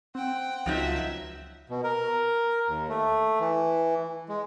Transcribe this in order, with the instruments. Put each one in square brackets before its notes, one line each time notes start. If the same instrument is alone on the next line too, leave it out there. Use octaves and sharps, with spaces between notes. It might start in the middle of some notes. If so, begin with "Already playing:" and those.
[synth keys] C4 [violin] F#5 G5
[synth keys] C#2 [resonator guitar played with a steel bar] F3 F#3 D#4 [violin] E5 F#5
[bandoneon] B2
A#4
D#2
A3
E3
G#3